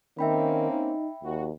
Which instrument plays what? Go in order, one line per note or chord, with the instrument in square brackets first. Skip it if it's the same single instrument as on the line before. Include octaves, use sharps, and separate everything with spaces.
[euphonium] D#3 [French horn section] A#3 C4 C#4 [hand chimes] E5 G5 B5
[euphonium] D#4
[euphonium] D#2 [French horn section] F#4